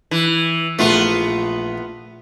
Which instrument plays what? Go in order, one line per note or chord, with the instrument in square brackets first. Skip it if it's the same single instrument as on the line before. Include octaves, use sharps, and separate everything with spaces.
[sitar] E3
[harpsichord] A#1 A3 [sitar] B3 F4